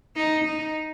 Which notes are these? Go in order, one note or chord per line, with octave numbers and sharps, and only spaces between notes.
D#4
D#4